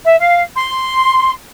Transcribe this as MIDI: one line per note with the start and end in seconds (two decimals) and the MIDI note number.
0.02 0.15 76
0.18 0.41 77
0.55 1.32 84